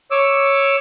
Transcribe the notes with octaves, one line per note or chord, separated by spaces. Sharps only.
C#5 D6 E6